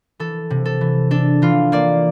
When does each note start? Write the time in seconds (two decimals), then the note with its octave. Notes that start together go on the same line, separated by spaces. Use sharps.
0.19 E3 A4
0.50 C3
0.66 A4
0.81 E3
1.11 D4 A4
1.42 E3 F4
1.72 A#3 D5